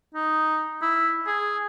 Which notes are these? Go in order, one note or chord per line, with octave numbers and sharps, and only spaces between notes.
D#4
E4
G#4